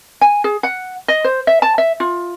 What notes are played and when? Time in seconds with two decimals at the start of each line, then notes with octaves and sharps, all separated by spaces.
0.21 G#5
0.44 G#4
0.63 F#5
1.08 D#5
1.24 C5
1.47 E5
1.62 A5
1.78 E5
2.00 F4